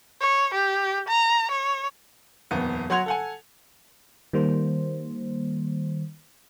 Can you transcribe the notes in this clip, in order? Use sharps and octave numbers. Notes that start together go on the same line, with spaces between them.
C#5
G4
A#5
C#5
D#1 F2 B3
F#3 F#4 F#5 C6 G#6 F7
A4 F#5 G#5
D#3 G3 A#3 C5